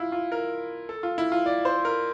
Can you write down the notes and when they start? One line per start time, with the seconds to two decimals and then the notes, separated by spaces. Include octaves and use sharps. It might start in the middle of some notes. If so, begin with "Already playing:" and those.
Already playing: E4 F4
0.12 F4
0.32 A#4
0.89 A4
1.03 F4
1.18 E4
1.32 F4
1.46 D5
1.65 C5
1.85 A#4